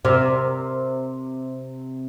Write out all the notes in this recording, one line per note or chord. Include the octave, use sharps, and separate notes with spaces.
C3 A#4